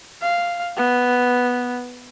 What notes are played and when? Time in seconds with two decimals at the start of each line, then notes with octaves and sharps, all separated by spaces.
0.22 F5
0.77 B3